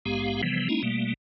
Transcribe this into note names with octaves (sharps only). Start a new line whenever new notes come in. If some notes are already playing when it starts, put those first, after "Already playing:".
A#1 G#2 G#3 B3 G4 F5
C3 E3 F3 G3 B3
G#3 A#3 C#4 D#4 E4
B2 G3 A3 A#3